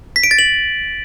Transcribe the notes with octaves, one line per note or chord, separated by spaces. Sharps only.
B6
D7
A6
F#7